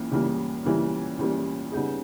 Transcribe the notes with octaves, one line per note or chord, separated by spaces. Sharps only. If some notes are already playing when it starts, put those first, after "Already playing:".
Already playing: C#2 C#3 E3 A#3
C#2 C#3 E3 G3 A#3
C#2 C#3 E3 G3 A#3
C#2 C#3 E3 G3 A#3
C#3 G3 B3 D#4 G#4